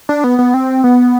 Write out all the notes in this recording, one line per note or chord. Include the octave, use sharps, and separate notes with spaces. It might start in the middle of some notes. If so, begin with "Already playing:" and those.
D4
B3
B3
C4
B3